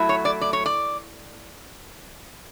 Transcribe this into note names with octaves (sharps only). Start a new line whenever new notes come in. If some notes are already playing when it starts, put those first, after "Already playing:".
Already playing: F#3 A3 E4
C#5
D5
D5
C#5
D5